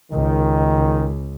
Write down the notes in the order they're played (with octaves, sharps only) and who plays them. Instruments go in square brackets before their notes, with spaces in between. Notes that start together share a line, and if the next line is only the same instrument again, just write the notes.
[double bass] C#2 [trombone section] D#3